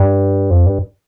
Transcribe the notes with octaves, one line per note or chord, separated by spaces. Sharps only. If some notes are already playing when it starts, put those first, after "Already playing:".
Already playing: G2
F2
G2